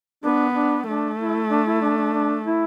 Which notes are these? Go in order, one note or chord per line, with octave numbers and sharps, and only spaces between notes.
B3 D4
D4
A3 D4
E4
D4
E4
D4
D4
D4
E4